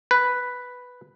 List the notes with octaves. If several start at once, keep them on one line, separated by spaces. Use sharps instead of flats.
B4